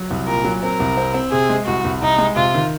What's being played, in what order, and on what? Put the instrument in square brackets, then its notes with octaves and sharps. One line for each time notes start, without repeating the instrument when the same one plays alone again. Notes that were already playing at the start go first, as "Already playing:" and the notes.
Already playing: [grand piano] F#3
C2
[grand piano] A#2 [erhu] A#4
[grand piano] F#3
[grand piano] C4 [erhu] A#4
[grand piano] C2
C4
C4
[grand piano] C3 [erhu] G#4
[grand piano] G#3
[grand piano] C2 [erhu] F#4
[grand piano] C2
[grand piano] C2 [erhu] D#4
[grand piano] G#3
[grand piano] C3 [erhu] F4
[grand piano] D#3